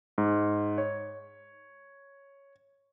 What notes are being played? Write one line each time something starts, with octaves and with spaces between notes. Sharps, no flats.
G#2
C#5